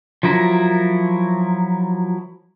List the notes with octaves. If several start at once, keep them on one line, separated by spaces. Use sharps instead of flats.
F3 F#3 E4 A#4